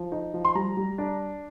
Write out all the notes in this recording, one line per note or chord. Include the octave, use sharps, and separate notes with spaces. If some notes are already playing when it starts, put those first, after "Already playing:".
Already playing: F3
D#4
F3
C6
G3 A#5
G3
D4